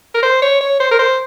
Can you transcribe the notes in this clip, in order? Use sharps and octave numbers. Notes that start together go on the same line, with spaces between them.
A#4
C5
C#5
C#5
C5
A#4
C5